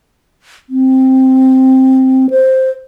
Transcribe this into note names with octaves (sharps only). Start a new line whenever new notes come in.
C4
C5